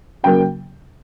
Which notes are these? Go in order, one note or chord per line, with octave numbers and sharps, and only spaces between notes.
C#3 F#3 A#3 G5